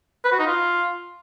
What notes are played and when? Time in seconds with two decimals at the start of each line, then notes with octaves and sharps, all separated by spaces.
0.25 B4
0.32 F#4
0.39 D#4
0.46 F4